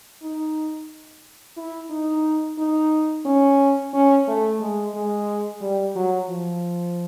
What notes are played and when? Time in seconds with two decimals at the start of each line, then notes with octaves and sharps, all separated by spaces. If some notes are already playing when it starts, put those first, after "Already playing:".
0.22 D#4
1.57 E4
1.90 D#4
2.58 D#4
3.26 C#4
3.93 C#4
4.28 A3
4.60 G#3
4.95 G#3
5.61 G3
5.96 F#3
6.30 F3